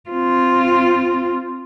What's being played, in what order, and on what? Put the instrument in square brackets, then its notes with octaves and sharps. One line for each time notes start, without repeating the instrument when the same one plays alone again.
[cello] C4 F4